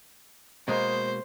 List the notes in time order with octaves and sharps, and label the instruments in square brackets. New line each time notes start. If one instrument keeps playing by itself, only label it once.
[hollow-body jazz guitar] B2 G#3 A#3 [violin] C5